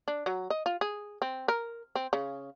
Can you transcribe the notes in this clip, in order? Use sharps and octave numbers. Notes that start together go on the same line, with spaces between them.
D4
F#3
D#5
F4
G#4
C4
A#4
C4
C#3